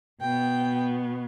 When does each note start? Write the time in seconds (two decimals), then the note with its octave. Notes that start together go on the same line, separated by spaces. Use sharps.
0.21 B2 B3 G5